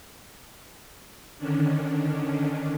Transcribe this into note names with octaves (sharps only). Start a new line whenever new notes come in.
D3 D#3 C#4 D4